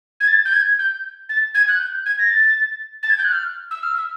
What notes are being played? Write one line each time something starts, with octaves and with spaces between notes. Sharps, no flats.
G#6
A6
G6
G#6
G6
A6
G#6
F#6
G6
G#6
A#6
A6
A6
G#6
G6
F#6
F6
E6
F6
E6